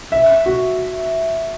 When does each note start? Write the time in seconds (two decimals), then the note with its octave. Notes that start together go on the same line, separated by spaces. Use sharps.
0.12 E5
0.46 F#4